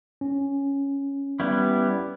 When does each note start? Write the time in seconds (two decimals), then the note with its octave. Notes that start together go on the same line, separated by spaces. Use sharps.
0.21 C#4
1.40 G3 B3 E4